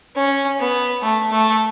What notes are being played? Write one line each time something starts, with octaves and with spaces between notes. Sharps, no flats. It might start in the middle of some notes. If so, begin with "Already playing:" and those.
C#4
B3
A3
A3